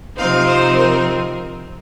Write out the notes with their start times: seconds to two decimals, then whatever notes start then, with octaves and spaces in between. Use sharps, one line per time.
0.17 C3 F3 C4 D#4 F5
0.46 C5
0.76 A#4